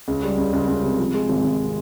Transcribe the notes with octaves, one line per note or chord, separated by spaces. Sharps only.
C#2
G3
C#2
C#2
C#2
C3
F3
G#3
G#1
G#1